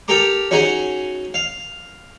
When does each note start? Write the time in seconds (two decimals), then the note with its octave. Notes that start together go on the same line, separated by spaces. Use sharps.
0.08 G4 A4 A#4 A#5 D6
0.51 C#4 D#4 F#4 G#4
1.34 F5